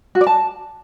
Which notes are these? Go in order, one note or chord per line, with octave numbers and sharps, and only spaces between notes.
F#4
D5
A5